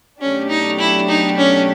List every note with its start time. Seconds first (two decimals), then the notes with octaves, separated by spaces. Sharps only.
0.20 B2 F#3 A3 C#4 D4 G4
0.49 D#4
0.79 E4
1.09 D#4
1.37 C#4